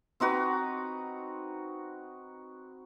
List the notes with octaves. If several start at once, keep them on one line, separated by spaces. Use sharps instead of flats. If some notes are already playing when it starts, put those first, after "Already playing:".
C4 D#4 F#4 B4